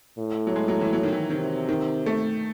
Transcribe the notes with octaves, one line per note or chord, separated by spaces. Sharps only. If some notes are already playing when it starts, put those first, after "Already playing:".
A2
F#3
G#3
F#3
E3
F#3
D#3
E3
C3 D#3
D#3
A3